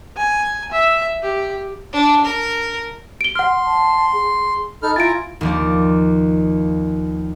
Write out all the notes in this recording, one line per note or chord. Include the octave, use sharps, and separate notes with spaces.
G#5
E5
G4
D4
A#4
D7 G7
F#5 C6 F6
A5
G#4
D#4 A4 B5 F6
E4 F4 G#5 A#5 A6 D7
D#2 F3 D5